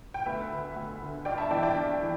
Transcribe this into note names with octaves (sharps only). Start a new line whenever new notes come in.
G5
D2 B4 E5
D3
D2
D3
G2 D5 G5
E5 A5
E3 D5 G5
D5 G5
G2
E3